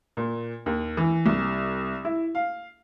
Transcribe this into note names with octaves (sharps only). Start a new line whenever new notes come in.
A#2
D#2
E3
C2
E4
F5